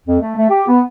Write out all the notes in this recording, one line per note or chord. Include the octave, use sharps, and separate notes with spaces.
F2
A3
A3
G4
B3